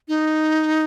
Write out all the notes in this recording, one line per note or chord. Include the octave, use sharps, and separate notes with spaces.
D#4